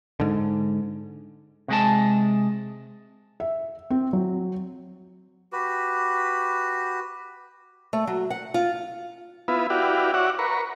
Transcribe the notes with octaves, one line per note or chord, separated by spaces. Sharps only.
G#2 D3
C3 G#3 A5
E5
C4
F#3
F#4 G4 B4
A3
F#3
F#5
F4
B3 E4 F4 B4
E4 F#4 G4 B4 D5 F5
F#4 C#5 D5 E5 F#5
A#4 B4 C#6